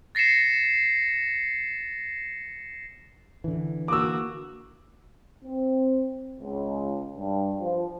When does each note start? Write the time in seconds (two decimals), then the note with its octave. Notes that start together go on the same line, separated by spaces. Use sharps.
0.15 A6 A#6 C7 C#7 E7
3.44 D3 E3
3.88 A#3 F#4 D6 E6
5.45 C4
6.40 C#2
7.18 G2
7.60 F3